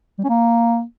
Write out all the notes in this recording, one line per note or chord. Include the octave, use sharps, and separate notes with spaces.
G3
C#4
A#3